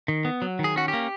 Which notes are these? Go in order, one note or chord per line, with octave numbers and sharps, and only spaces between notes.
D#3
B3
F#3
D#3
G#4
C#4 F#4
G4
A#3